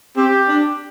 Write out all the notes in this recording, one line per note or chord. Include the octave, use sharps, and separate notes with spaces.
C4 G4
D4